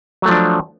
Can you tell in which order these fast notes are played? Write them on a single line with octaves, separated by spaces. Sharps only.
F#3 A3 F3 D4